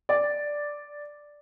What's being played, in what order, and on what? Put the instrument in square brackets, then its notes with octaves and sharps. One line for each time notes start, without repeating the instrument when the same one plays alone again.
[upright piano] D5